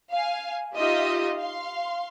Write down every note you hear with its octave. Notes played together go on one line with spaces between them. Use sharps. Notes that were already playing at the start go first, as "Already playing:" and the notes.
F5 G#5
D#4 F4 G4 D#5 E5
F5 C6